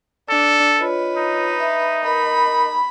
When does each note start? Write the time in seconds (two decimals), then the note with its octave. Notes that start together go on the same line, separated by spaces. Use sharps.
0.29 D4 A4
0.80 F4 B4 C#5 D#5
1.17 D#4
1.60 E5
2.05 A#4 D#5 B5